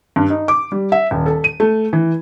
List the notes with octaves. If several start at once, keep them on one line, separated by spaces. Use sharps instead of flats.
G2
D#4
D6
G3
E5
D#1
A4
D#7
A3
E3